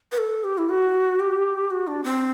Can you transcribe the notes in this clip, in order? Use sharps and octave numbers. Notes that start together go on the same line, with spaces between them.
B4
A4
G4
E4
F#4
G4
F#4
D4
C4